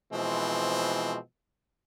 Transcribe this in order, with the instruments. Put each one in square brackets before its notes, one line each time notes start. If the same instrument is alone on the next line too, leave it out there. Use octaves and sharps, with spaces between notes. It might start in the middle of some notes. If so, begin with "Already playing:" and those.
[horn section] B2 E3 F3 G#3 C4